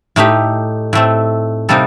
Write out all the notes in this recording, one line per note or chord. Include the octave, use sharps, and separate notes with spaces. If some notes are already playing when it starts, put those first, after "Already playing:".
A2 A3 D#4 G4
A2 A3 C4
C3 G3 A#3 D#4 A4